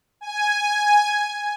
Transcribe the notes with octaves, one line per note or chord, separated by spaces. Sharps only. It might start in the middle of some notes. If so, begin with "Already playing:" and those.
G#5